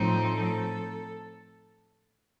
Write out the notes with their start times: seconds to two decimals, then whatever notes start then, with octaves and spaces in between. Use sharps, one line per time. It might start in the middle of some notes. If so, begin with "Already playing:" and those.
Already playing: A2 F3 C4 D#4
0.26 A4